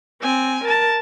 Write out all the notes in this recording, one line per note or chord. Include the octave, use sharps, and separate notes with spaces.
C4 G#5
A#4 A5